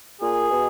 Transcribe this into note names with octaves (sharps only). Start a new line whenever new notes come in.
A#2 G#4
B2